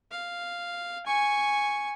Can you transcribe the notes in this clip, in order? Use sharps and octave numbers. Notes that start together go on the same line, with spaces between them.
F5
G#5 C#6